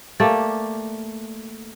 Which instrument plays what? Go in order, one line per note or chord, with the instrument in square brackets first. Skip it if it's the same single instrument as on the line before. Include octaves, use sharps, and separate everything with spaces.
[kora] A3 A#3 G4 D5